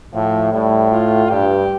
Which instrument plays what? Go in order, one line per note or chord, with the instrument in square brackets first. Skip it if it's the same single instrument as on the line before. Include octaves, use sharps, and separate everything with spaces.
[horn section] A2 [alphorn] F3
[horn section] A2 [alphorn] G3
[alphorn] F4
[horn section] G2 [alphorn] G4